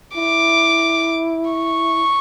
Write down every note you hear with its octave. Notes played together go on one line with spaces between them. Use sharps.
E4 D6
C#6